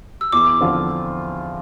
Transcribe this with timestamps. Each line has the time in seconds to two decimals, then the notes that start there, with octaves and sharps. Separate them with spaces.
0.21 E6
0.32 E2 D6
0.61 D3 F3 C4 F4